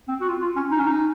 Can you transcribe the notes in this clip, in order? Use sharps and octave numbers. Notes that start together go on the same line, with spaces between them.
C4
F#4
F4
F4
C#4
D#4
C#4
D#4